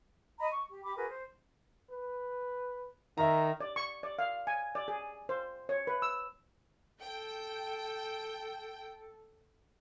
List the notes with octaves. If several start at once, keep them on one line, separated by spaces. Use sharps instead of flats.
D#5 A#5 B5
C#6
G4
G4 B5 D6
F#4 G#4 A#4 B4
C5
B4
D#3 E5 A#5
D5
C#6
D5
F5
G#5
D5
G#4
C5
C#5
B4
E6
A4 G5